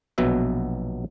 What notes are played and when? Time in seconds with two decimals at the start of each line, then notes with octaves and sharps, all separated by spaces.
0.18 A#1 B2 F#3 B3 E5